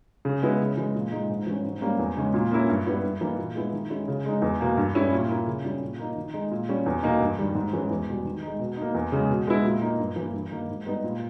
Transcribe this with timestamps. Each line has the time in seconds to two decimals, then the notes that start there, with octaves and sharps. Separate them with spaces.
0.25 C#3
0.42 G#3 B3 E4
0.60 C#3
0.77 E3 G#3
0.94 A#2
1.12 G#3 D#4
1.29 G#2
1.47 E3 G3 C#4
1.64 G#2
1.81 G3 A#3 C#4
1.99 E2
2.17 C#3 G#3 C#4
2.34 A#2
2.52 A#3 C#4 E4
2.69 G2
2.87 G3 B3 E4
3.03 G2
3.21 E3 A#3 D#4
3.38 A#2
3.55 G#3 B3 E4
3.73 D#3
3.90 G#3 C#4 E4
4.08 C#3
4.26 G#3 D#4
4.42 E2
4.60 B2 A#3
4.77 G2
4.95 G3 C#4 E4
5.12 A#2
5.29 A#3 E4
5.47 C#3
5.64 G3 C#4 E4
5.81 A#2
5.99 A#3 D#4
6.16 D#3
6.34 G#3 D#4
6.51 A#2
6.69 G3 C#4
6.86 E2
7.03 B2 A#3 D#4
7.21 G2
7.38 D#3 G3
7.55 G#2
7.73 E3 G#3 C#4
7.90 E2
8.08 B2 G3
8.25 D#3
8.43 G#3 D#4
8.59 B2
8.77 A#3 D#4
8.95 E2
9.12 C#3 G#3
9.30 B2
9.47 G#3 B3 E4
9.65 A#2
9.82 A#3 D#4
9.99 G2
10.16 E3 A#3
10.34 G2
10.51 D#3 A#3 D#4
10.69 G#2
10.86 G3 B3 D#4
11.04 A#2